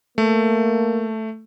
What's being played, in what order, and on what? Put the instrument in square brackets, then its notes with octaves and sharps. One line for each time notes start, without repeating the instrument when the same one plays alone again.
[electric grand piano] A3 [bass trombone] A#3